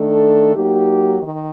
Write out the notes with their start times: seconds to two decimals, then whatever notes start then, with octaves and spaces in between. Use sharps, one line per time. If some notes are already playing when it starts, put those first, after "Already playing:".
Already playing: D#3 A3 D4 A4
0.54 F#3 A#3 D#4 G4
1.22 D#3